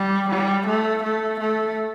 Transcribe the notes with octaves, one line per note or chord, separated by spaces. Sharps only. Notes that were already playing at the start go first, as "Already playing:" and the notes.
Already playing: G3
G3
A3
A3
A3